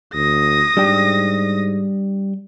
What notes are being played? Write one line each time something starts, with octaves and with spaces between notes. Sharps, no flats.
D2 D#6 A#6
G#2 G3 D4 G4